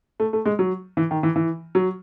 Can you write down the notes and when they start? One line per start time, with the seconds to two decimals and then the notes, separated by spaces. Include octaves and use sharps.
0.20 A3
0.33 A3
0.46 G#3
0.59 F#3
0.97 E3
1.11 D#3
1.23 E3
1.36 E3
1.75 F#3